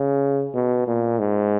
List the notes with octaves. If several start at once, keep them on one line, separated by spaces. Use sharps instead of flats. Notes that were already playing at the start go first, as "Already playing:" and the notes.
Already playing: C#3
B2
A#2
G#2